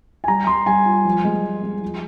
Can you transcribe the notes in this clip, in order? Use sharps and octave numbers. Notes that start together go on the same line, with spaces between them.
G#5
G3 A#5
G3 C6
G3 G#5
F4
F3
G#3
F3
G#3
F3